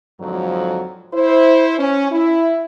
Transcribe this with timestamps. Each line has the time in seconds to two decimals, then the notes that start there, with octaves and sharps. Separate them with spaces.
0.20 F2 G#2 D3 F3 F#3
1.14 E4 C5
1.79 C#4
2.12 E4